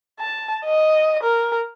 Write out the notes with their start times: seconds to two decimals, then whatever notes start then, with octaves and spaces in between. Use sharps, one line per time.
0.20 A5
0.64 D#5
1.23 A#4